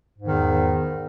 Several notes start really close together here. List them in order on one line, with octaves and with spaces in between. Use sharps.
G#2 E2 D#3